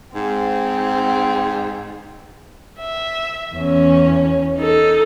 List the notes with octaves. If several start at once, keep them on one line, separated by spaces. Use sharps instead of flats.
G#2 C4
E5
E2 C#4
D#4 A4